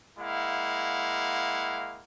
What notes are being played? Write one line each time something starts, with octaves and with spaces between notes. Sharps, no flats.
G#3 A#3 E4 F5 F#5